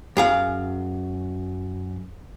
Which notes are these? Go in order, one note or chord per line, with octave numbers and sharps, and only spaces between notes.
F#2 G#4 F5